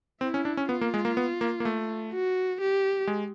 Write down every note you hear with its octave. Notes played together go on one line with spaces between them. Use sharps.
C4 E4
C#4
D4
C#4
B3 F4
A#3
G#3
A#3
B3
A#3
A#3
A3
F#4
G4
G#3